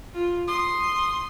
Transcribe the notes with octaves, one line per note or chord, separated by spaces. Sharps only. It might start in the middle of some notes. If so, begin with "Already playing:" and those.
F4
C6 D#6